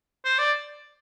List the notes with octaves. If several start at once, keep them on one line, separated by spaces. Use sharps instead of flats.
C5
D5